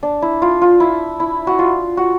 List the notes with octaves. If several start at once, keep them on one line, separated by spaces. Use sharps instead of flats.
D4
E4
F4
F4
E4
E4
F#4
F4
F#4